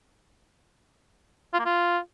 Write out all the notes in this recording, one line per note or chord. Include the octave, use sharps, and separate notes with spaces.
F4
A#3
F4